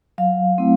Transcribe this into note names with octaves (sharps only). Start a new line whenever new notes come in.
F#3 F5
A3 C4 E4